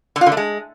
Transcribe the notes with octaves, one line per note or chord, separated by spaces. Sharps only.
D3
F4
D3
A3
G#3